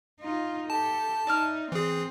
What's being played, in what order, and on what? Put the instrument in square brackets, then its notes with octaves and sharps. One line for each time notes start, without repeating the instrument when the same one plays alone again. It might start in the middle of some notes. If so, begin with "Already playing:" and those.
[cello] D#4 F4
[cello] G4 A4 [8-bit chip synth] A5
[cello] D#4 [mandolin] D5 E5 F6
[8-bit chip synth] E3 G#4 [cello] C4